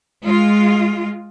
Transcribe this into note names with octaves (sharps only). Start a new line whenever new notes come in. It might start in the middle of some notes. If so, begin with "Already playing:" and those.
G#3 F4